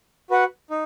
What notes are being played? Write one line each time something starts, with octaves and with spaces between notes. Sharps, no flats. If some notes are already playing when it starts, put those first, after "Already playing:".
F#4 B4 F#5
D#4